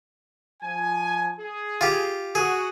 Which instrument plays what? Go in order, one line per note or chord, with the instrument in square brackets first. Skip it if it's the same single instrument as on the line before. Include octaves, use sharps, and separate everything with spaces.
[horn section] F3 G#5
G#4
[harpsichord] F4 G4
[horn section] F#4 [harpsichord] G#4